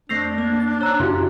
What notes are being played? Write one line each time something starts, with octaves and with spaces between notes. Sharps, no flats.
F2 A3 C4 D4 A#6 C7 F7
A#3
A6
C5 C#5 A#5 E6 F#6
F#2 C#3 C#4 E4 F#4 G4 C6